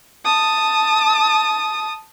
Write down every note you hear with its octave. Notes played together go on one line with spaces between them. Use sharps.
A5 D#6